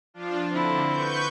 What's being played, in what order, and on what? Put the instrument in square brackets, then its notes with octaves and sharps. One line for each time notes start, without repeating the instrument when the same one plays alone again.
[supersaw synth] F3 D4 F4
[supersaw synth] D3 [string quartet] C4 E4
[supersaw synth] B4 C#6 G6